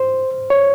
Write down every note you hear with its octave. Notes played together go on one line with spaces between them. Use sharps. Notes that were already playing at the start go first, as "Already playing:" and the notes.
Already playing: C5
C#5